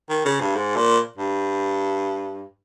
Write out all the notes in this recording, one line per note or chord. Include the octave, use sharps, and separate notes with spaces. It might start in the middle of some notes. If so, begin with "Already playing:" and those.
D#3
C#3
G2
G#2
A#2
G2